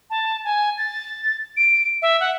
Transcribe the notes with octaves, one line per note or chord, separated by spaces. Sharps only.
A5
G#5
A6
D7
E5
F#5